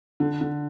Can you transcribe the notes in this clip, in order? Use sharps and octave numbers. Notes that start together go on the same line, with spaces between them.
D3
D3